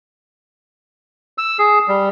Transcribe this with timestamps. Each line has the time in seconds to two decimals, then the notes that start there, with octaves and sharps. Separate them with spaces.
1.38 E6
1.59 G#4
1.88 G3